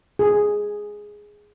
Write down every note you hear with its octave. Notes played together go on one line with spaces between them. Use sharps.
G#4